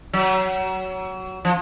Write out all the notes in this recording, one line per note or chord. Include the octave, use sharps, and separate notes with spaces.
F#3
F3